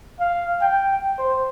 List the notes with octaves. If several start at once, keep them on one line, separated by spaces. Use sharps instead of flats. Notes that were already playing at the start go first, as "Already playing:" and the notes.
F5
G5
C5